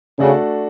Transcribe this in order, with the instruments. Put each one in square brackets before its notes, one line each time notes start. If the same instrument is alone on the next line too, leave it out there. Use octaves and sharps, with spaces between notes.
[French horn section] C#3 [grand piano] A3 D4 F#4 A4